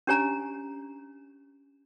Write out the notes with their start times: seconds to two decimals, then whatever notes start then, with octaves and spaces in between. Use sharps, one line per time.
0.07 C#4 D4 G4 C#5 G#5 A#5